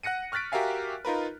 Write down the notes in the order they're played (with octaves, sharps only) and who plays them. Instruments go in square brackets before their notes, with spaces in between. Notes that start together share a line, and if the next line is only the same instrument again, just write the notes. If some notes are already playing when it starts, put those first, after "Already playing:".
[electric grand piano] F#5 F#6 A#6 C#7 D#7
C#6 F6 F#6 A6 B6 D7
F#4 G4 A#4 E5 F5 G#5
D#4 F4 A#4 B4